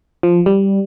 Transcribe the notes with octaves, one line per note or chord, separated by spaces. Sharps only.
F3
G3